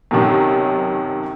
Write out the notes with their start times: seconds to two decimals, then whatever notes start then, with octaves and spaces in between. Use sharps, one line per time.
0.11 B1 F#2 C3 D#3 F#3